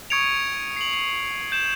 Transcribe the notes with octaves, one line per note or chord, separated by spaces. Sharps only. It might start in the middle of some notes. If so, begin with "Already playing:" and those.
C#6 D#6 G#6 C#7 D7 F7
C7 F#7
C7
G6 E7